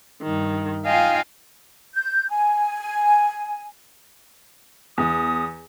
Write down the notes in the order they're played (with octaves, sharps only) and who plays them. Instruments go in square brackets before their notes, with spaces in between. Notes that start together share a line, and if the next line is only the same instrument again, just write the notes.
[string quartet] G2 D#3
D#4 F4 D#5 F5 G5 G#5
[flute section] G6
G#5
[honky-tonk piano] E2 [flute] D#6